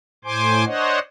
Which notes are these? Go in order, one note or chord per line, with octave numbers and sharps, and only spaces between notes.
A2 C5 G#5 C6 D6
D4 C5 C#5 D#5 F#5